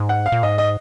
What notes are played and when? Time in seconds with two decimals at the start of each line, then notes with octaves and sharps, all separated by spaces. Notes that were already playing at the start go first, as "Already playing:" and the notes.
Already playing: G#2
0.09 F#5
0.26 F5
0.32 A#2
0.43 G#2 D#5
0.58 D#5